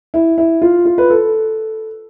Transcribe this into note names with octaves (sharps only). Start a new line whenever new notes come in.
E4
E4
F4
F4
B4
A4